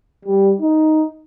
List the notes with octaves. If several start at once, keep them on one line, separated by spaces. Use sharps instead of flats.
G3
D#4